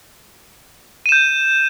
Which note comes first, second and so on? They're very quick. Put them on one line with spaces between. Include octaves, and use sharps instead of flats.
D#7 E7 G6